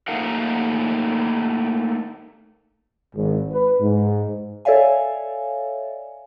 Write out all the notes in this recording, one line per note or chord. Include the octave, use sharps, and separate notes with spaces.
A3 A#3 D#4 A#4 F5 F#5
G#1
B4
G#2
A4 C#5 D5 E5 F5 G#5